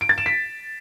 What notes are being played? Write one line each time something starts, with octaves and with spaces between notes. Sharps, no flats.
D7
A6
E7
B6